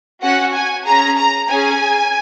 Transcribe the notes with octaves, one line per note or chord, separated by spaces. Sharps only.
C#4 F#4 F#5
G#5
C#4 G#4 A#5
A#5
C#4 G#4 G#5